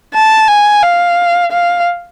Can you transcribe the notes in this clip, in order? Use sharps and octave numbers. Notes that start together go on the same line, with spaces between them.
A5
G#5
F5
F5